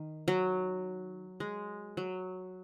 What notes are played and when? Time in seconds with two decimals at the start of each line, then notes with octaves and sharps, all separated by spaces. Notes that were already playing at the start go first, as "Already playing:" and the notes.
Already playing: D#3
0.28 F#3
1.40 G#3
1.97 F#3